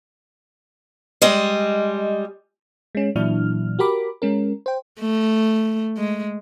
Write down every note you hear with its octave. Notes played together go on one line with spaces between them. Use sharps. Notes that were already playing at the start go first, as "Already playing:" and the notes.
G3 G#3 D#5
G#3 C#4
A#2 E3 F#3 D4 E4 F6
F#4 G4 A#4 B5 D6
G#3 C#4 A#4
C5 G5
A3
G#3